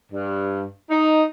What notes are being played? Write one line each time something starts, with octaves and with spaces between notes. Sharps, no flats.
G2
D#4